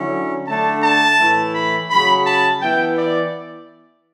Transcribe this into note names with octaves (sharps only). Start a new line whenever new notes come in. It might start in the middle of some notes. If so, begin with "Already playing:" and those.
Already playing: D3 F#3 C#4 E4
D3 A3 D4 A5
A5
A2 E3 A3 E4
B5
C#3 F#3 C#4 B5
A5
E3 B3 E4 G5
D5